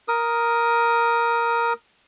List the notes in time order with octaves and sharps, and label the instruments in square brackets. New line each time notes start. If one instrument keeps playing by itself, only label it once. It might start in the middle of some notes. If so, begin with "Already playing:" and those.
[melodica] A#4 D#6